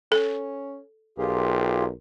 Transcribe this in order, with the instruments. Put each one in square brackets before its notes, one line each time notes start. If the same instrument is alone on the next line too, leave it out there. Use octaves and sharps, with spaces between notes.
[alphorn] C#4 [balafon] A4
[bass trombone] B1 [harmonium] F4 G4 G#4 [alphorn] A#4